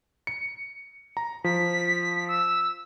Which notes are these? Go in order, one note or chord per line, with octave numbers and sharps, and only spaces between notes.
C#7
A#5
F3 B6
E6